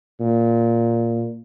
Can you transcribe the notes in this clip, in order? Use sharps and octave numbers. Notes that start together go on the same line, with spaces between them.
A#2